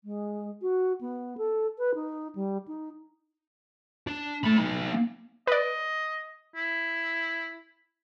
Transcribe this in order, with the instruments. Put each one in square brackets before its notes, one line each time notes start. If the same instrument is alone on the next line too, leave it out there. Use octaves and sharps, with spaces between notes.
[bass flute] G#3
F#4
B3
A4
B4
D#4
G3
D#4
[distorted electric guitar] D4
A3 B5
B3 D#4
[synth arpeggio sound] B4 D5 [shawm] D#5
[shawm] E4